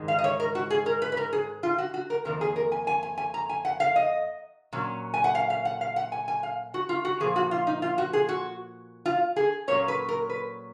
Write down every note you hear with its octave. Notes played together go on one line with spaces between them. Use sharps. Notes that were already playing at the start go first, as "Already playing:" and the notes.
Already playing: G#2 D#3 G#3
F5
D#5
C#5
A#4
F#4
G#4
A#4
B4
B4
A#4
G#4
F4
F#4
F#4
A#4
F2 D#3 A#3 A#4
G#4
A#4
G#5
G#5
G#5
G#5
A#5
G#5
F#5
F5
D#5
A#2 F#3 C#4
G#5
F#5
F5
F5
F#5
F5
F#5
G#5
G#5
F5
F#4
F4
F#4
A#2 F3 A#3 G#4
F#4
F4
D#4
F4
F#4
G#4
F#4
F4
G#4
A#2 F#3 A#3 C#4 C#5
B4
A#4
B4